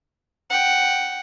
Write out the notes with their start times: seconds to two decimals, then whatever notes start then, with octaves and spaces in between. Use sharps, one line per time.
0.50 F#5 G5